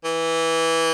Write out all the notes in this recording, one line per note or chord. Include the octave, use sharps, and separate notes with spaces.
E3